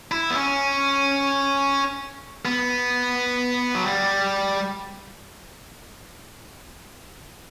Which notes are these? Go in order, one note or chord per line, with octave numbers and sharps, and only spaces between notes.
E4
B3
C#4
B3
F#3
G3